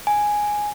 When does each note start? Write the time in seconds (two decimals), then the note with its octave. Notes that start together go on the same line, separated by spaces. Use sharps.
0.07 G#5